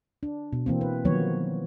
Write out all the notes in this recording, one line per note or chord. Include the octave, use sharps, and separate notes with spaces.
D4
B2
E3 A#3 C4
B4
D#3 F3 F#3 A#3 B3 C#5